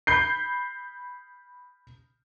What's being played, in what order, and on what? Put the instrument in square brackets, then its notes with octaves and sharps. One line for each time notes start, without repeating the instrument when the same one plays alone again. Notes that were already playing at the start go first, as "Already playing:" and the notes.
[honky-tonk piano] B5 G6 C7